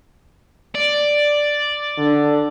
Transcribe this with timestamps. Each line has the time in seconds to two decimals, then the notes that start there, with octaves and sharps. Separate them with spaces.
0.75 D5
1.98 D3